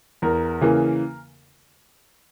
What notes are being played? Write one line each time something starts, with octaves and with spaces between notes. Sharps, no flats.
E2 A#4
C#3 E3 A#3